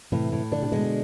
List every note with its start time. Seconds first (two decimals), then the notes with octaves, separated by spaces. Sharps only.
0.12 A2 C3 E3
0.32 A2
0.52 D3 D4
0.62 C3
0.71 B2 D3 G#3